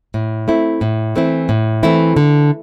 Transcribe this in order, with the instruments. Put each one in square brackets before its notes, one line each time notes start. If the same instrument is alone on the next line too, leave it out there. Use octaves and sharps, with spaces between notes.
[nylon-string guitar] A2
A3 C4 E4
A2
E3 A3 C4 E4
A2
E3 A3 C4 E4
D3